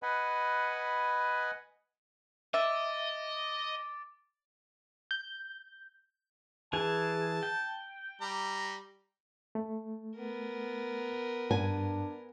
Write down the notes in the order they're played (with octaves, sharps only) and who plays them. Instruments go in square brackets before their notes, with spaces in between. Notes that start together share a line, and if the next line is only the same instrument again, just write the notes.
[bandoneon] B4 D#5 F#5 G#5 B5
[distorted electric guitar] D#5 [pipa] E5 [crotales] D6 A6 D7
[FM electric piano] G6
[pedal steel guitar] E3 G#4 [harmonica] A5
[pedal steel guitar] G5
[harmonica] G3 A#5
[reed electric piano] A3
[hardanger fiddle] B3 A#4
[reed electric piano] G2 [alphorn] D4 [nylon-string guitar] G#5